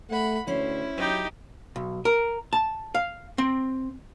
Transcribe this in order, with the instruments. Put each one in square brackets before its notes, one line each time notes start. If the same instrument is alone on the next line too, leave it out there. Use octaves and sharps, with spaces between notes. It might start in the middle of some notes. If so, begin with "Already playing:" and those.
[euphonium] A3 [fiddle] F#5 B5
[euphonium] D2 [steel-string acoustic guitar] C#4 C5 [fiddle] E4
[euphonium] F#3 [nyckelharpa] D#4 G4
[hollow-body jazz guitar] B1
A#4
A5
F5
C4